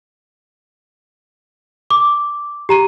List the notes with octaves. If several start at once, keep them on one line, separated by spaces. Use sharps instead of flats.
D6
G4 A#5 D#7